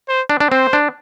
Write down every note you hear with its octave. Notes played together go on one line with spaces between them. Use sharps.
C5
D4
D4
C4 C5
D4